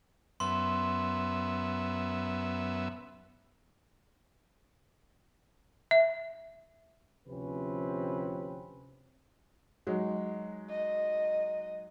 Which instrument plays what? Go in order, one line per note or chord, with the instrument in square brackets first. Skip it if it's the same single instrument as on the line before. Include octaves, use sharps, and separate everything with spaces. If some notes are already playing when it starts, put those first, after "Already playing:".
[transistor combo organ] F#2 B3 E5 [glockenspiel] C6
[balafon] E5
[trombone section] D2 C3 F3 C4 C#4 B4
[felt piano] F#3 G#3 D#4
[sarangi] D#5